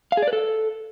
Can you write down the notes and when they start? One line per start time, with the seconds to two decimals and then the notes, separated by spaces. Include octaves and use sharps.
0.12 F5
0.17 G#4
0.22 D5
0.28 B4
0.33 A4